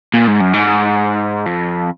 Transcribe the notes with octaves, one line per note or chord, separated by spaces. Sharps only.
A#2
G#2
F#2
G#2
F2